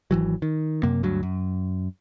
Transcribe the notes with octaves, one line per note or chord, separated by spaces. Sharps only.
G#1 E3 F#3
D#3
F#2 C3 A#3
D2 G2 F#3
F#2